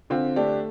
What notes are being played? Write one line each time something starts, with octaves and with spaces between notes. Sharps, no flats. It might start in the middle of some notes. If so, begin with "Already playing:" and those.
D3 C4 F4
A3 D4 G4